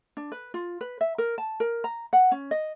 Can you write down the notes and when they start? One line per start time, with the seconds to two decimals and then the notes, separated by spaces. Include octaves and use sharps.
0.17 D4
0.32 B4
0.54 F4
0.81 B4
1.01 E5
1.18 A#4
1.38 A5
1.60 A#4
1.84 A#5
2.13 F#5
2.32 C#4
2.51 D#5